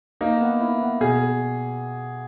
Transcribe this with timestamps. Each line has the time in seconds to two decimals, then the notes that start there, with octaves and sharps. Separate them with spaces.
0.21 A#3 D#4
0.41 B3
0.61 E4
0.81 B3
1.00 B2 G#4